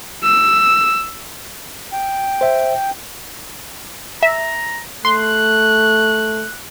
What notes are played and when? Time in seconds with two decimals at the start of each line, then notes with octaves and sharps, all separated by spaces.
0.23 E6
1.93 G5
2.41 C5 E5
4.23 E5 A#5
5.05 A3 C6 F#6